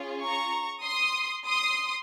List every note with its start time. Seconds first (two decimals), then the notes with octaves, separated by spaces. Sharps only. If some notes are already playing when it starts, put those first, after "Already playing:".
Already playing: C#4 F4 G#4
0.22 A#5 C#6
0.85 C6 D#6
1.48 C6 D#6